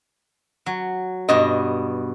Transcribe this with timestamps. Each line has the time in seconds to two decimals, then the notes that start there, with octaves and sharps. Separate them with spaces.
0.66 F#3
1.29 G2 B2 D#5